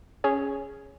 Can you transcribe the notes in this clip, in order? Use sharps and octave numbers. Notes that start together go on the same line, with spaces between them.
C#4 G#4 C#5